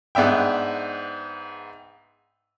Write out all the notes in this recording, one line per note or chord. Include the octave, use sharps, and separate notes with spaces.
G#2 B3 D4 E5 G5